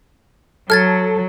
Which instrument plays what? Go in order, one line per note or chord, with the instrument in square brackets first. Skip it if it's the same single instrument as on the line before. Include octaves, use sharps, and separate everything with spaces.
[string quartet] F#3 [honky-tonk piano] A4 [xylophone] F6 G#6 A6